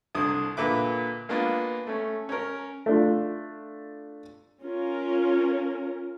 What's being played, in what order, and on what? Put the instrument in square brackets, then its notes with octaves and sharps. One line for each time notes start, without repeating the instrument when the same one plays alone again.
[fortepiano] C2 D3 D4 D#6
A#2 D3 B4 E5 D6
G#3 A#3 B3 D4 F4
A3 C#4
C#4 A#4
A3 D4 F4
[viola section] C#4 F4 A#4